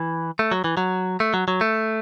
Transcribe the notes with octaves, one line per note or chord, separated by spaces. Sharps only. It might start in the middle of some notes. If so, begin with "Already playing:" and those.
Already playing: E3
A3
F#3
E3
F#3
A3
F#3
F#3
A3